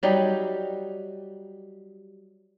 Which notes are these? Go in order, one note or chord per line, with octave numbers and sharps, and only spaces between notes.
F#3 G3 D#4 G4